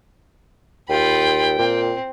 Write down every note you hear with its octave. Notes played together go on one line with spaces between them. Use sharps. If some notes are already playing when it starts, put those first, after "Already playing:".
D#2 F4 G5 B5
A#2 C4